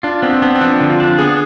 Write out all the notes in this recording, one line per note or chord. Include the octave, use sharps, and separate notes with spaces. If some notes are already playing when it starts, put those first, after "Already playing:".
D4 F4
B3 C4
C4
B3 D4
C4
F3 D4
D3
F4
D4
B3 G#4